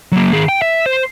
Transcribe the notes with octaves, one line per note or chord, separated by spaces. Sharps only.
F#3 A#3
D#3 G#4
G5
E5
C5